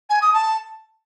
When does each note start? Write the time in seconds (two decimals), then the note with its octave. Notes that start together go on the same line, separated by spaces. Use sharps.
0.10 G#5
0.22 D#6
0.34 A5